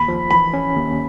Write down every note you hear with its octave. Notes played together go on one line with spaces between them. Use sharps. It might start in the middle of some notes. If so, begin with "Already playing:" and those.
Already playing: D#2 B5
F3
E3 B5
C#4
D#2